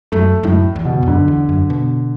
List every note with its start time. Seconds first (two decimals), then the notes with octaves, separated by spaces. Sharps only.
0.12 F#2 A3
0.43 F#2 A2
0.76 E2
0.85 B2
1.03 E2
1.07 F#2 D3
1.28 E2
1.49 F#2
1.70 B2